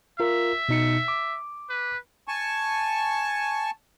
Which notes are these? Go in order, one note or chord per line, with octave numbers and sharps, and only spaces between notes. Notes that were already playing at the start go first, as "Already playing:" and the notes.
F4 A#4 E5
B2 D#4 C#7
D6
B4
G#5 A5 C#6